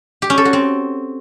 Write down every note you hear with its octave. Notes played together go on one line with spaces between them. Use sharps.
G4
C#4
A4
F#4
C4